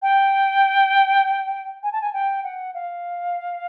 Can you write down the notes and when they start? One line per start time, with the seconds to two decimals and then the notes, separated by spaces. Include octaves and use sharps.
0.02 G5
1.83 G#5
1.92 A5
2.01 G#5
2.13 G5
2.44 F#5
2.74 F5